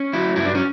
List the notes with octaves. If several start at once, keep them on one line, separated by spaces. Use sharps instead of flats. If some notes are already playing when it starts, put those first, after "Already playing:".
Already playing: C#4
F#3 E4
G2 E4
D4
C#4